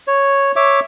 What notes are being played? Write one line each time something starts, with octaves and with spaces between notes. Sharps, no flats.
C#5
C#5 E5 D6